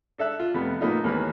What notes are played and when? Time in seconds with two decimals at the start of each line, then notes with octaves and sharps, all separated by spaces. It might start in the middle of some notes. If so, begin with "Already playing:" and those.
0.18 D4 A4 E5 F#6
0.40 F4
0.54 F2 C3 A3 B3
0.81 A2 A#3 B3 D#4 F4
1.04 D#2 E3 A3 A#3 B4 C#5